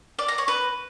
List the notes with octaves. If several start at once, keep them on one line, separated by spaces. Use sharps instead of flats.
D5
A#5
C#5
B4